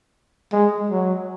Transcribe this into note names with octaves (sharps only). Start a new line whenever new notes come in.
G#3
F#3